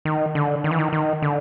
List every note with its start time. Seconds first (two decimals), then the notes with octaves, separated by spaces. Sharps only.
0.05 D#3
0.35 D3
0.64 D#3
0.71 E3
0.78 D#3
0.93 D#3
1.22 D3